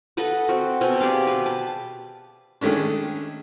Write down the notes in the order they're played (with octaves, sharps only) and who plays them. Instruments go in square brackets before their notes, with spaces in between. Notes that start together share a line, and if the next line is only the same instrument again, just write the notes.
[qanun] A4 B4 D#5 F#5
C4 F#4
B2 C4 G#5
G4 G#4 D5 F5
B4
A5
[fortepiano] D#3 G#3 A3 C#4 D4